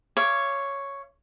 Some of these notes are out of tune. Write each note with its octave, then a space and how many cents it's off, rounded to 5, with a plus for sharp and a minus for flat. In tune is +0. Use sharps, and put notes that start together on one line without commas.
C#5 +0 F5 -30 D6 -5